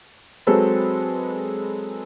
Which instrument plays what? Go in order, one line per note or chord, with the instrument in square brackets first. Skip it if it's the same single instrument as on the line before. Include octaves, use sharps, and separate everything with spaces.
[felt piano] F#3 G#3 C4 A4 B4